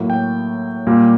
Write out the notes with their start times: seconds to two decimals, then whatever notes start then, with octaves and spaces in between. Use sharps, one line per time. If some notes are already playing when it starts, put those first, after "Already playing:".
Already playing: A2 F#3 A#3
0.10 G5
0.87 A#2 G3 A#3